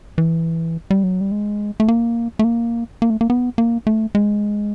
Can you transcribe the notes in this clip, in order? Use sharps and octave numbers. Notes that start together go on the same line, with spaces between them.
E3
G3
F#3
G3
G#3
A3
A#3
A3
A#3
A#3
A3
A#3
B3
A#3
A3
G#3